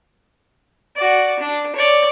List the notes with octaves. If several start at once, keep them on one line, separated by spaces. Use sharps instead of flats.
F#4 D5
D4
C#5 D5